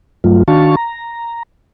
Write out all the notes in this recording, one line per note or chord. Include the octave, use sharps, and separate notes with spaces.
G2 F#3 A3 F4
D#3 D4 F#4 F5 A5 C#6
A#5